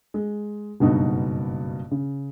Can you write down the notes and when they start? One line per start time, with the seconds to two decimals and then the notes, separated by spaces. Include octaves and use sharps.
0.14 G#3
0.80 F#1 G2 B2 D#4 F#4
1.91 C#3